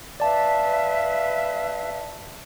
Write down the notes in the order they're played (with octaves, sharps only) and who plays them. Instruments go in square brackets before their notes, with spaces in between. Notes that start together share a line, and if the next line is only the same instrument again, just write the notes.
[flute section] B4 E5 F5 [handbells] D5 A5